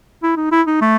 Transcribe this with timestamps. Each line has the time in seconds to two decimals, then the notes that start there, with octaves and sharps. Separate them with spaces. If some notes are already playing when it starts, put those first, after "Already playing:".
0.23 E4
0.37 D#4
0.52 E4
0.67 D#4
0.82 A3